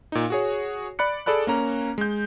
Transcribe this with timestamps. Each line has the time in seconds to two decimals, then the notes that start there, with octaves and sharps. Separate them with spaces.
0.12 A#2 D#4
0.30 F#4 G#4 C#5
0.99 D5 B5 F#6 C#7
1.26 G#4 A4 D5 B5 F#6
1.47 A#3 C#4 A#5
1.98 G#3 G6